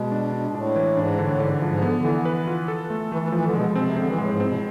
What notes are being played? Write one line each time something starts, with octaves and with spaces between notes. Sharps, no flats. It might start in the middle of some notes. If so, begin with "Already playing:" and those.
Already playing: B2 G#3
D4
D4
B2
A2 D4
E3
G#2 D4
A2 D3
G#2 D3
G#2
F3
G#2
D3 B3
D3
E3
B4
F4
A4
A3
E3 A3
E3
E3 F3
D3
B2 G#3
B2
C4
C3
D3 C4
E3
A2 G#3
G#2
A2 C4
B2
A2